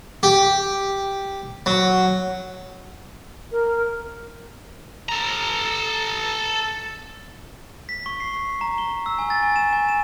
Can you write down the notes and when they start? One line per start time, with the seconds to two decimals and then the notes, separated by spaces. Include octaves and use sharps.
0.23 G4
1.66 F#3
3.52 A#4
5.09 A4 A#5
7.89 B6
8.06 C#6
8.20 C7
8.61 A#5
8.78 G7
9.06 E6
9.19 G#5
9.30 A6
9.43 G#5
9.56 E7
9.73 G#5
9.89 E7